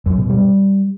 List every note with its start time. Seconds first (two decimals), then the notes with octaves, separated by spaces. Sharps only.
0.06 F#2
0.18 B2
0.30 G3